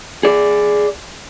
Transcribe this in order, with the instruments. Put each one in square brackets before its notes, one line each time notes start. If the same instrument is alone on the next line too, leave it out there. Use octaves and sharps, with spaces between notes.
[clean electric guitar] G#4 D5